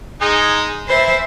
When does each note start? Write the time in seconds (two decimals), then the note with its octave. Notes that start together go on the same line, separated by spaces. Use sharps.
0.21 G#3 D#4 G#4
0.88 E3 C5 E5